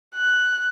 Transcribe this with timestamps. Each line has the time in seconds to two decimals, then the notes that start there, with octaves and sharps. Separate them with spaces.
0.14 F#6